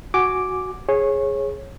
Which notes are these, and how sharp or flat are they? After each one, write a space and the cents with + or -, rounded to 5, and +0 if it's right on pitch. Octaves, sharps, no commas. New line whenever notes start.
F#4 +0 G#5 +0 D6 +0
G#4 +0 C#5 -20